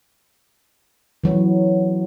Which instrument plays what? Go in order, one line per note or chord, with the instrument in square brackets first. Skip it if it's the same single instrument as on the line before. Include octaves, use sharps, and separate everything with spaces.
[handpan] E3 F#3